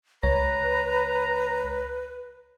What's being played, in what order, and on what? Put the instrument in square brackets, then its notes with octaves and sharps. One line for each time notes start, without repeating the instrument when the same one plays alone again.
[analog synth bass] C#2 [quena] B4 [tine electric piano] C#5 [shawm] A#5